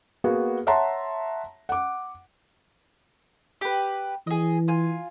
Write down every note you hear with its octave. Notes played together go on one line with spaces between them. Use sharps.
A#3 B3 F#4 G#4
C#5 E5 F#5 A5 A#5 C6
F#5 D6
G4 B4
E3 G#4 D#5
F4 G#5